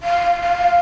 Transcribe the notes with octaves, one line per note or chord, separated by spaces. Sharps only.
F5
F5